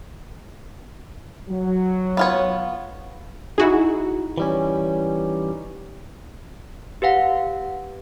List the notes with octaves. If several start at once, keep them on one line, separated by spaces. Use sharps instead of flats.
F#3
B3 F4 C#5
D#4 E4 F#4 G#4
E3 G3 C#4
G4 B4 F5 F#5